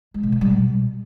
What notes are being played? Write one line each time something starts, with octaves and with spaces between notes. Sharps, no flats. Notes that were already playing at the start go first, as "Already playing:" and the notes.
G#3
B2
D3
G3
B2